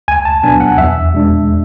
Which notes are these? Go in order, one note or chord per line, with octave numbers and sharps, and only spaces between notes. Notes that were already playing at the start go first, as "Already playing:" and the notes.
C#2 G#5
A5
B2 F#3 B3 D4 G#5
F#5
E2 E5
B2 G#3 D4